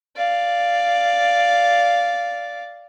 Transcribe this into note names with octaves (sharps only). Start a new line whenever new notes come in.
D5 F5